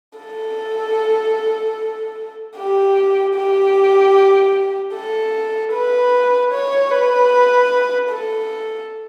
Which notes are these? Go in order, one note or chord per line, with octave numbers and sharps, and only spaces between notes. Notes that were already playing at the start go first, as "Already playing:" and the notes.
A4
G4
G4
A4
B4
C#5
B4
A4